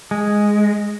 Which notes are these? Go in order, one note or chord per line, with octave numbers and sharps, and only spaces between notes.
G#3